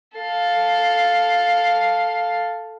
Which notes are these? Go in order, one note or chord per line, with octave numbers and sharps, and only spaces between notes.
A4 F5